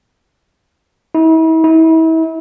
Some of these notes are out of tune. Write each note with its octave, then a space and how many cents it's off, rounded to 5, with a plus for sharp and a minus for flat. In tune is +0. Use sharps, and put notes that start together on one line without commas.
E4 -40
E4 -35